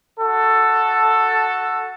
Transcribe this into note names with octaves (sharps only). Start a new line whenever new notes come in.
F#4 A4